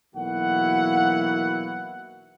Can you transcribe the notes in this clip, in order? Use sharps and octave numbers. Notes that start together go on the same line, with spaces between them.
B1 E3 A#3 E4 F#4 F#5